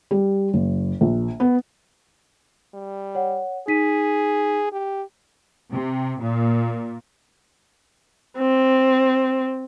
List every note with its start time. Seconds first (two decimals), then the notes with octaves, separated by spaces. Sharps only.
0.11 G3
0.54 F#1
1.01 A#1
1.40 B3
2.74 G3
3.15 C#5 F#5
3.68 D#4 G#4 B6 D#7
4.72 G4
5.71 C3
6.20 A#2
8.39 C4